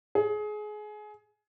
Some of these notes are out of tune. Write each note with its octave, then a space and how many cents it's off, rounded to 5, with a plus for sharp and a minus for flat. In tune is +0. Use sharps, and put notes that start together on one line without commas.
G#4 +25